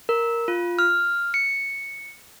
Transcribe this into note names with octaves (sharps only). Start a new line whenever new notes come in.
A#4
F4
F6
C#7